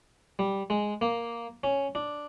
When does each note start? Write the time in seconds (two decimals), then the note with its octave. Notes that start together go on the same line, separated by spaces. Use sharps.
0.39 G3
0.70 G#3
1.01 A#3
1.64 C#4
1.95 D4